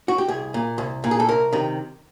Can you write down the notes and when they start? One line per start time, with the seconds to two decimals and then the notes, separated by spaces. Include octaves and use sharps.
0.08 F#4
0.18 G4
0.28 C2 G#4
0.54 A#2
0.78 C2
1.04 A#2
1.11 G#4
1.20 A4
1.28 C2 A#4
1.53 C3 D#3